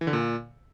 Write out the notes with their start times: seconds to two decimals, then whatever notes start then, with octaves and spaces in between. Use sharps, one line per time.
0.01 E3
0.07 D3
0.13 A#2